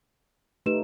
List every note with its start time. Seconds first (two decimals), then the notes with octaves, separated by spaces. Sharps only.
0.66 A3 D#4 G4 B4 E7